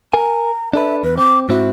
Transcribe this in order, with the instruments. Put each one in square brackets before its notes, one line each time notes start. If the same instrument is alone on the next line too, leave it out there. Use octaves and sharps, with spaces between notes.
[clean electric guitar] A#4 G#5 [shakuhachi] A#5
[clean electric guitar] D4 A4 B4 [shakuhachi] E5
[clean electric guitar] E2 [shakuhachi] B4
[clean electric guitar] C4 [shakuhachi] D6
[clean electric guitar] G#2 C4 E4 [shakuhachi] F#4